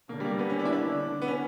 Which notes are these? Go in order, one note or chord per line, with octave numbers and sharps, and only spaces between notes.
D3 A#3
G3
A#3
B3
C#4
D4
E4
D4
D3
B3
C#4